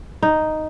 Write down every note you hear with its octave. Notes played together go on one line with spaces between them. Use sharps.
D#4